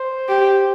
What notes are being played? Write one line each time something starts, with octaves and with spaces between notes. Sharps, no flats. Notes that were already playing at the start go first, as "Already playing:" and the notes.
Already playing: C5
G4